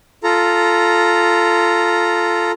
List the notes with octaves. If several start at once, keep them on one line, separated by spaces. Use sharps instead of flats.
F4 A4 A#5